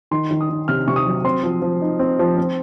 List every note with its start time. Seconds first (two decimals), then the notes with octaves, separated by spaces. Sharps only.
0.11 D#3 C6
0.31 D#3
0.41 D#6
0.50 D#3
0.68 C3 F6
0.87 C3 C#6
0.96 D#6
1.07 F#3
1.24 C4 C6
1.43 F3
1.62 F3
1.82 D#4
1.99 C4
2.19 F3
2.37 C4